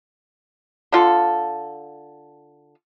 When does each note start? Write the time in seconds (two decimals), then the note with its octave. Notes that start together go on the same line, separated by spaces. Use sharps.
0.92 D3 F4 A4